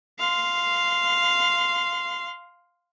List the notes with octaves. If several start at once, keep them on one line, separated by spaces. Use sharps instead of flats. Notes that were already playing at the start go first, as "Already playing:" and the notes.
F5 C6